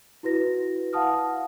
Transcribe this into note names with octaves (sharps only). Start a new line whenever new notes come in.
E4 F#4 B4 A#6
F5 F#5 A5 D#6 F6